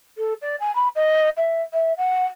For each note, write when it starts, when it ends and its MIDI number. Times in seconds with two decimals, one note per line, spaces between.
0.18 0.34 69
0.42 0.56 74
0.60 0.74 80
0.75 0.88 83
0.95 1.29 75
1.37 1.62 76
1.73 1.93 76
1.98 2.26 78